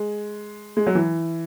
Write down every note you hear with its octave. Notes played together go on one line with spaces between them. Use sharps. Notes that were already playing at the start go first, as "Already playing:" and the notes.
Already playing: G#3
G#3
F#3
E3